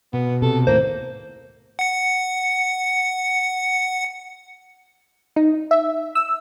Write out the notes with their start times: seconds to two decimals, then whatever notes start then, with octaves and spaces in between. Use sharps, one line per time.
0.13 B2 B3
0.42 C3 A4
0.67 D#2 A2 A#3 C5
1.79 F#5 C#7
5.36 D#4
5.71 E5
6.15 E6